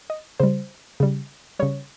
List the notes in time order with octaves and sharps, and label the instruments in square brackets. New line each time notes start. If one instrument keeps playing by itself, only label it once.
[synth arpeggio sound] D#5
C#3 G3 C5
C#3 G3
C#3 G3 C#5